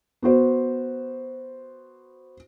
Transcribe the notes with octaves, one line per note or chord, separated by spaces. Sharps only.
B3 F#4 C5